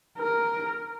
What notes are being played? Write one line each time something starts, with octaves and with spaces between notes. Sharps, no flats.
A#4